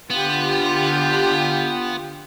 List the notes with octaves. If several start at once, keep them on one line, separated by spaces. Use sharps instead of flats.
D3 B3 F4 G4